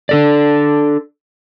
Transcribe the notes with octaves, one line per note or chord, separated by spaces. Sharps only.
D4 A4 D5